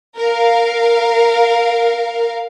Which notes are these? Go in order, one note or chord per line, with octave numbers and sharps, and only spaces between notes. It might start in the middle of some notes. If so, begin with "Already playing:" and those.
A#4 F5